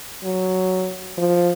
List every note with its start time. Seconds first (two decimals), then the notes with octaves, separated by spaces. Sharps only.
0.24 F#3
1.18 F3